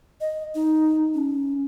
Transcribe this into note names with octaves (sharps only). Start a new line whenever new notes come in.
D#5
D#4
C#4